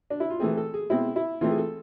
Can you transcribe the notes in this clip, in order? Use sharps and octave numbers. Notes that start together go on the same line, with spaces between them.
D4
E4
F4
E3 A3 C4 G#4
A4
G#4
B2 G#3 C4 E4
E4
E3 A3 C4 F4
G#4
A4